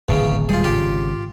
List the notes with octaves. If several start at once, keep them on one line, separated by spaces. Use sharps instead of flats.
D1 G#1 E2 C#3 C#4
D#1 G3 G#3 F4 G#4
G#1 C#3 F4 G4